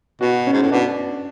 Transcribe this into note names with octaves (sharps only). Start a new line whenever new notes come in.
B2 F#4
C#4
G#2
A2
B2 D4